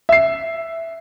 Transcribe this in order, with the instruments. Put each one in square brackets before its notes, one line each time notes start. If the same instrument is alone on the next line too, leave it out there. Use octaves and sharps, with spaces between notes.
[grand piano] E5 C7